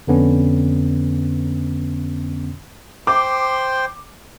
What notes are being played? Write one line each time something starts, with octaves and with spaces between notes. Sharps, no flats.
F2 D3 B3 C#4
C5 G5 C6 D6